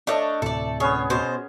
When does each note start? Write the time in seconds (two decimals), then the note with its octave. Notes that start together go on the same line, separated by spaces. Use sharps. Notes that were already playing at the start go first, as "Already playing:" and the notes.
0.07 A3 D4 C#5 D#5 D6
0.42 D2 A2 C3 A4 D5
0.80 B3 C#4 G#4 C#5
1.10 B2 C5